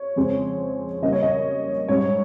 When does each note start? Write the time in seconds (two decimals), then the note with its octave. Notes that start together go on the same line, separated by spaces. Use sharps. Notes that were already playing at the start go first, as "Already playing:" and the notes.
Already playing: C#5
0.16 F2 C#3 G#3 C4
1.02 C#3 G3 A#3 C#4 D#5
1.13 C#5
1.23 D#5
1.88 G#2 G3 C#4 C#5